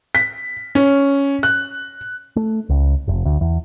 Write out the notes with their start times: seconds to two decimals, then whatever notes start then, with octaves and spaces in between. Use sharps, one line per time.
0.15 B6
0.75 C#4
1.43 F#6
2.36 A3
2.69 C#2
3.08 F1
3.25 D2
3.41 E2